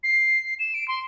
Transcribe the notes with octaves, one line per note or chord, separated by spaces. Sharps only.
C7
E7
D7
C6